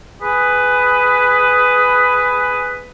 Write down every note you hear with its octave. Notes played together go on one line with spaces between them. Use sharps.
G#4 B4